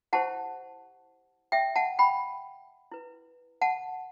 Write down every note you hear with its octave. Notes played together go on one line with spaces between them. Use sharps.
E4 G4 C5 F#5 A5
E5 G5
F#5 A5
G5 B5
E4 B4
F#5 A5